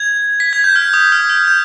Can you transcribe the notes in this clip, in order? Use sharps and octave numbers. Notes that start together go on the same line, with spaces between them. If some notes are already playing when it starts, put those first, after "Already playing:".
Already playing: G#6
B6
G#6
G6
F6
D#6
F6
F6
G6